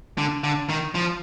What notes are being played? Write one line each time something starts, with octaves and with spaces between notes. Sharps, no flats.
D3
D3
D#3
F3